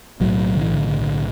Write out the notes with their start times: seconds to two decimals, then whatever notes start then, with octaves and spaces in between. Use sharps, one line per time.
0.20 B1 A2 F#3
0.55 D3
0.61 E3
0.74 D3
0.87 D3
1.01 D3